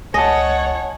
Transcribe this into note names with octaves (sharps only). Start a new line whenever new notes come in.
C#2 C#5 D#5 F#5 G#5 A5